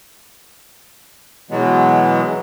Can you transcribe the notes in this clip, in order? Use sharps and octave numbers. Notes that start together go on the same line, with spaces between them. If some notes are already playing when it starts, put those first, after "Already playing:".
B2 E3 F#3 G#3 B3